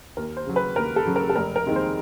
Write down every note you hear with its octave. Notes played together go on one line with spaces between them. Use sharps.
D#2 A#4
C5
C#3 F#3
B4
D#2 A#4
A4
C#3 F#3
A#4
A4
F1 A#4
A#4
D#2 D#3 G#3 C4
C5